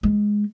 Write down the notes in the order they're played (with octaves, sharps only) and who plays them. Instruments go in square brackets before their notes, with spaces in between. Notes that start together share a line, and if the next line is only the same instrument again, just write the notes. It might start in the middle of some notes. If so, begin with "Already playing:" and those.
[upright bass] G#3